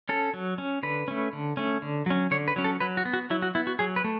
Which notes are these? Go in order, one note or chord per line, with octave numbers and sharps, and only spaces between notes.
C#4 A4
F#3
C#4
D3 B4
A3 C#4
D3
A3 C#4
D3
F#3 C#4
D3 C#5
B4
F#3 C#4
A4
F#3 B4
F#4
B3
F#4
F#3 E4
F#4
B3 E4
F#4
F#3 G#4
B4
A3